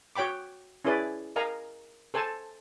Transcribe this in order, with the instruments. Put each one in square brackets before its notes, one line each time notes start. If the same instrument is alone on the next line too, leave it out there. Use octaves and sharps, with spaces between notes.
[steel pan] F#4 C#5 G5 B5 D6
C#4 E4 G#4 B4 D5
A#4 D#5 F5 G#5 A#5
A4 C5 G#5 A5